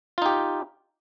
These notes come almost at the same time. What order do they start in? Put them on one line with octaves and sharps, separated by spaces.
F4 D#4 G4